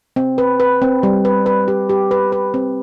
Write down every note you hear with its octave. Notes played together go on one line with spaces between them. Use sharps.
C4
B4
B4
C4
G3
B4
B4
G4
G4
B4
B4
C4